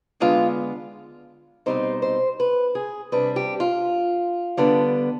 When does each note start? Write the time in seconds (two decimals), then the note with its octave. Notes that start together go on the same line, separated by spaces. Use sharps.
0.20 D3 G#3 B3 D4 F4
1.66 B2 G3 C4 D#4 C5
2.02 C5
2.40 B4
2.75 G#4
3.12 C3 G3 D4 B4
3.36 G4
3.60 F4
4.57 D3 G3 B3 D4